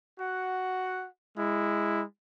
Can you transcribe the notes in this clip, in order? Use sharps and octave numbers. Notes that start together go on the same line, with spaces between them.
F#4 F#5
G#3 E4